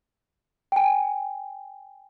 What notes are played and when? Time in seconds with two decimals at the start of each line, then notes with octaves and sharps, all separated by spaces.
0.72 G5
0.76 G#5